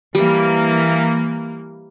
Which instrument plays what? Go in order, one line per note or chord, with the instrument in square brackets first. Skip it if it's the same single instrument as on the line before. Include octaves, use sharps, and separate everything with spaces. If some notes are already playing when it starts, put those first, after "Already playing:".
[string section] E3 A#3 [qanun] G3